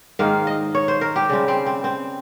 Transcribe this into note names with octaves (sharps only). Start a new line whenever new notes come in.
G#2 D#3 A#3 F5
D#5
C#5
C5
A#4
G4
C#3 G3 C4
C4
C4
C4